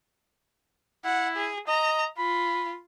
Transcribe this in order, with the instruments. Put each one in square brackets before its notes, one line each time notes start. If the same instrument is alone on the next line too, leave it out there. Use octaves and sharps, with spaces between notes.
[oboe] E4 [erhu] F#5
[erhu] G#4
[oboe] D#5 [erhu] A#5
[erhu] F4 [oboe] B5